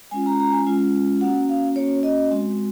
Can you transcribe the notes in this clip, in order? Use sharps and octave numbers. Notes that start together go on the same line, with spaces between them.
G#3 C#4 F4 G#5
A#5
A#5
G#5
G#3 C#4 F4
A#3 C#4 F#4 F#5
F5
A#3 C#4 F#4 C#5
D#5
G#3 C4 F#4